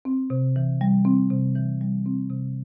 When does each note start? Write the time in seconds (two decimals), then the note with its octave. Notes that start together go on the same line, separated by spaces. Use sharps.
0.05 C4
0.30 C3
0.56 E3
0.81 G3
1.05 C4
1.31 C3
1.55 E3
1.81 G3
2.06 C4
2.30 C3